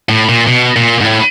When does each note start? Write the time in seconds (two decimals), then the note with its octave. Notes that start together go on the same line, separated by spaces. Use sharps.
0.09 A2
0.29 A#2
0.47 B2
0.76 A#2
1.01 G#2
1.04 A2